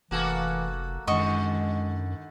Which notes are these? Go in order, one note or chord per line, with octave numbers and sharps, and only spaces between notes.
F1 E3 A#3 F#4 A4
F#2 D3 D#3 G#3 F#4 D#5 C#6